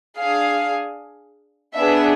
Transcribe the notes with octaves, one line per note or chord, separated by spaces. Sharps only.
D4 G#4 F5
B3 D4 G#4 E5